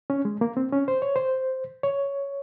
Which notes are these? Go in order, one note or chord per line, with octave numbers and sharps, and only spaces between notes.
C#4
G#3
A#3
C4
C#4
C5
C#5
C5
C#5